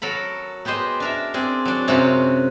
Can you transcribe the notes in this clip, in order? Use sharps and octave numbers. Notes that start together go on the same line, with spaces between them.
F#3 A4 A#4 B5
B3 G4 G#4 C5 D#5
D4 A#4 E5
C4 D4 G#4
F#3 D4
F#2 C3 G#3 C#4 F4 F#4